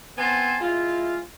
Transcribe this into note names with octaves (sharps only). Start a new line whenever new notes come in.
B3 C4 C5 G#5 A5
G#3 E4 F4